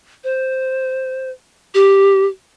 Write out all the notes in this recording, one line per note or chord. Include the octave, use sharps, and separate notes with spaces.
C5
G4